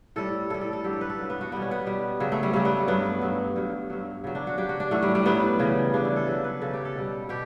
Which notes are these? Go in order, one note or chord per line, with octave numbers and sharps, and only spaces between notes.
A2 G3 A4
A2 G3 A4
A4
A4
G2 F#3 G4
A4
B4
A4
G2 F#3
B3
F#4
B2 G3 B3
C#4
B3
B2 G3
C#3 F#3
A3
G3
C#3 F#3 G3
B3
A3
G2 F#3 B3
G2 F#3
G2 F#3
G2 F#3
C#3 F#3
D4
F#4
C#3 F#3 G4
F#4
D4
A2 F#3 A3
G3
G3
A2 F#3 B3
C#3 E3 G3
C#3 E3 G3 D4
E4
A4
C#3 F#3 B4
B4
C#3 F#3 A4
G4
A4
B2 G3
B2 G4